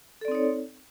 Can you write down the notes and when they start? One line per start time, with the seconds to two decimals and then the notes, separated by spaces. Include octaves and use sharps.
0.21 A4
0.25 D5
0.28 C4
0.31 D#4
0.35 C#5